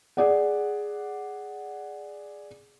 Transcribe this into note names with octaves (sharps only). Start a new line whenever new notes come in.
G#4 D5 F#5